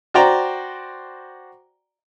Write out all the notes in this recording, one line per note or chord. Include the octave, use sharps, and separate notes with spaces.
F#4 C5 D5 G5 A#5